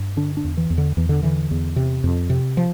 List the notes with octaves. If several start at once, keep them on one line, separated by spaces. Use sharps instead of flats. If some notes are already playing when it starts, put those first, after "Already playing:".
Already playing: G2
D3 D4
D4
E2
E3
E2
D3
E2 E3
D3
D3 E3
E2
C3
F2
C3
F3